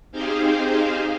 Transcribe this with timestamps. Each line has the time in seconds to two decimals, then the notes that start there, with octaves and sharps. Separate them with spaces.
0.12 C4 D#4 G4 G#4 C5 F5